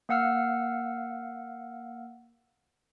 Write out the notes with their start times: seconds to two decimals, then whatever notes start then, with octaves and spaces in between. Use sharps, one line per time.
0.09 A#3 F5 F#5 E6 F6